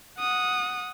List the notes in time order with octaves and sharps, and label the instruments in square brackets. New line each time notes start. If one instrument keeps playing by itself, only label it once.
[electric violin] F#5 D#6